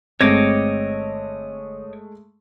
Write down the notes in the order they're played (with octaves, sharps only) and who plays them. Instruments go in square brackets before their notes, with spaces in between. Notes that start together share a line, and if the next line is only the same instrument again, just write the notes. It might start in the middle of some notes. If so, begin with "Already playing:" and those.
[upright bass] G1 [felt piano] G#3 A3 [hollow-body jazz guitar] C4 [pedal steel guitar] C#5 D#5 D6